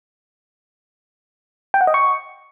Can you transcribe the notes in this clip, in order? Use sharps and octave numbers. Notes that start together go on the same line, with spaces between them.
G5
F#5
D#5
C#6